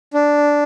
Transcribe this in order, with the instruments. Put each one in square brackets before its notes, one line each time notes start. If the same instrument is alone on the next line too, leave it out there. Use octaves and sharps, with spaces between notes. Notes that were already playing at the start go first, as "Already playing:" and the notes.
[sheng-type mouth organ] D4